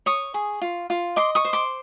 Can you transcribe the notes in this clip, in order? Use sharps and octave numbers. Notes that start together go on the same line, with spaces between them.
C#5 C#6 D#6
G#4
F4
F4
D#5 C6 D6
C#6 D#6
C5
C6 D6